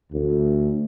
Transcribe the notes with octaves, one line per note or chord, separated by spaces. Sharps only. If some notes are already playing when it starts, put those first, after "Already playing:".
D2